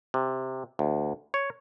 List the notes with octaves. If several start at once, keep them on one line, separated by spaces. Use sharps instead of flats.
C3
D2
C#5